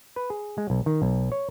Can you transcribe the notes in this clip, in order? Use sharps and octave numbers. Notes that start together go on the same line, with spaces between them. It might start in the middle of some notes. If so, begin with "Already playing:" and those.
B4
G#4
G#3
B1
D#3
B1
C#5